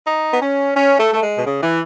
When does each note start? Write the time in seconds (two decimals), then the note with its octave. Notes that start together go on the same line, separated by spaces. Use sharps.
0.05 D#4
0.32 B3
0.41 C#4
0.75 C#4
0.99 A3
1.13 A3
1.21 G#3
1.38 B2
1.44 C#3
1.62 E3